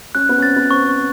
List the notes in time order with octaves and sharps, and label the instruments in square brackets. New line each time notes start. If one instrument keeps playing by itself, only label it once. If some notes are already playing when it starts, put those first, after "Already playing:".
[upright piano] C#4 [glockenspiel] F#6
[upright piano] B3
C#4
[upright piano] C4 [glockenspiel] A6
[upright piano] B3
[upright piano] C4 [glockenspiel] C#6
[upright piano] C4